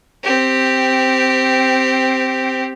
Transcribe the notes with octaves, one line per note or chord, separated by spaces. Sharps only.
C4 G4